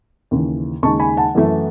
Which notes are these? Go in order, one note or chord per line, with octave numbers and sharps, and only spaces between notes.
D#2 C#3 E3
D#2 C#3 G#3 D#4 A5 C#6
G#5 B5
F#5 A5
F#2 E3 A3 E4